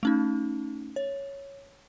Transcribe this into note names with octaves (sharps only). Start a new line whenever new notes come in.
A3 C#4 D#4
C#5